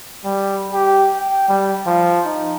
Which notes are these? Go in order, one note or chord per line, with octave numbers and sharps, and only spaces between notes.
G3
G4
G5
G3
F3
D#4